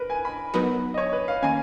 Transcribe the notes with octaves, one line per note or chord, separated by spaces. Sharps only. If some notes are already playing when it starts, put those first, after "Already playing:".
Already playing: A#4 B4
G#5
B5
F#3 B3 D#4 F#4 A#4 B4
D#5
C#5
B4
F5
D#3 A#3 C#4 G#5